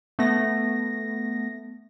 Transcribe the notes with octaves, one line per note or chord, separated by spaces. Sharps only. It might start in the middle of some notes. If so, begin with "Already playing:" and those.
A3 B3 A#6